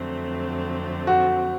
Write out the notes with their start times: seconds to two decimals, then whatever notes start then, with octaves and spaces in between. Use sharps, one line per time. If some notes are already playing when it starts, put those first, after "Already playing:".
Already playing: F2 D3 F#3 A3 C4
1.07 F#4